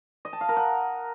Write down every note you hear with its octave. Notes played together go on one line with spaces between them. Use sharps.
D#5
A5
F5
A#4
F#5